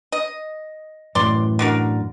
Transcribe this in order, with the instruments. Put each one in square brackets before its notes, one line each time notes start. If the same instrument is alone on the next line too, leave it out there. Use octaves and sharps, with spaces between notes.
[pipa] D#5
[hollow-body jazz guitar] F#2 A2 E3 [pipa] D5 C6
[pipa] D3 F#4 A#4